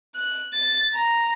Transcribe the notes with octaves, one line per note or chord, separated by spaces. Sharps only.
F#6
A6
A#5